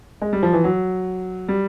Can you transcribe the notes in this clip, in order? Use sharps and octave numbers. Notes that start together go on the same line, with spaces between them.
G#3
G3
F3
E3
F#3
G3